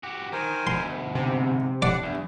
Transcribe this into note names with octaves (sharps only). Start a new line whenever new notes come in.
F#4 G4
D#3 A#4 C5 G#5
D2 B2 C6
G#2 C3
A2 D4 D5 F#5 D6
E2 G2